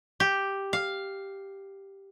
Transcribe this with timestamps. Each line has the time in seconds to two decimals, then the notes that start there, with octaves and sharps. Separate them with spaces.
0.20 G4
0.73 F5